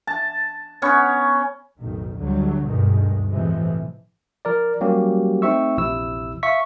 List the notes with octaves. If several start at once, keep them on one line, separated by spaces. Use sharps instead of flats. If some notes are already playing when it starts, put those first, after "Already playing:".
A5
B3 C#4 C#5
B1 F2 A2 D#3
D2 D3 F#3 G3
D2 G2 B2 D#3 G#3
A2 C3 E3 F3 G#3
F3 A#4 D5
F#3 G3 A#3 C#4 F#4 G4
A3 C4 D#4 E5 C#6 E6
A#1 E2 C3 F3 E4 E6
E5 F5 C#6 B6